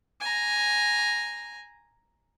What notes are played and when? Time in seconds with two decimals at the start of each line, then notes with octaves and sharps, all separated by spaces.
0.21 G#5 A#5